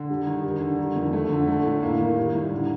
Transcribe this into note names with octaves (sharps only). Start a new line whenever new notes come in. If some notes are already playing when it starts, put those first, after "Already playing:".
Already playing: D3
G3
D#3
G3
D3
D#3
F2
A3
D3
A3
A2
A#3
D#3
G3
A2
D3